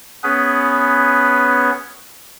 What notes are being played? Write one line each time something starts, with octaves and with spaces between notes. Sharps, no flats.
B3 C#4 G#4 B4